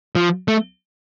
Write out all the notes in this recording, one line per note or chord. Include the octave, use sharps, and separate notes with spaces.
F3
A3